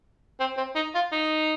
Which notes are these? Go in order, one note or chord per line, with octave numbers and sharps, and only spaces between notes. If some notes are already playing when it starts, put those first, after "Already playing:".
C4
C4
D#4
F4
D#4